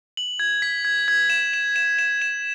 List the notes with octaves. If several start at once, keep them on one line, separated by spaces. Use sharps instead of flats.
F#7
G#6
B6
G#6
G#6
E7
E7
E7
E7
E7